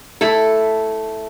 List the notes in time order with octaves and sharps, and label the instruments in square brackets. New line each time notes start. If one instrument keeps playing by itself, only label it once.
[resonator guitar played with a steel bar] A3 E4 A4